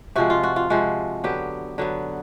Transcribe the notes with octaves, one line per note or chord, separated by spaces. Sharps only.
C3 F3 G#3 F#4
F4
F#4
F4
C3 F3 G#3 F#4
D3 F#3 B3 G4
D3 F#3 B3